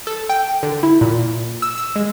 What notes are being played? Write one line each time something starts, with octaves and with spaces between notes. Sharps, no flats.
A4
G5
D3
E4
A#2
E6
E6
G#3